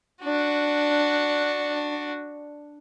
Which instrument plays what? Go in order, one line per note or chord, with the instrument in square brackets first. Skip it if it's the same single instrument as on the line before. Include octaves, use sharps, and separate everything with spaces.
[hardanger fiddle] D4 F#4